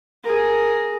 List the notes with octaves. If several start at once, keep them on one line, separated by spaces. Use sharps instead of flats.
G#4 A#4